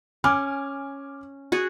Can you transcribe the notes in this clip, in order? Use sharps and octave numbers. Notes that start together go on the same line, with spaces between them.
C#4 G#5 D6 F6
F#4 G#4